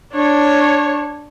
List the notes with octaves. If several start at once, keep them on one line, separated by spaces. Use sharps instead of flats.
D4 C#5